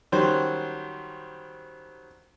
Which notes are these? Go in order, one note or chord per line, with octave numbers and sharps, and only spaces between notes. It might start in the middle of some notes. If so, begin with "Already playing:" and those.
D#3 F#3 G3 C#4 C5